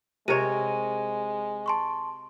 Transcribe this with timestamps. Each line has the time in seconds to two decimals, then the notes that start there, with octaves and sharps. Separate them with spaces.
0.28 C3 G#3 A#4 C#5 D#7
1.66 A5 C6 C#6